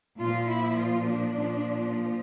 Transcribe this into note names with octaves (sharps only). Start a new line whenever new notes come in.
A#2 F3 F4
E4
F4
D4
A#2 F3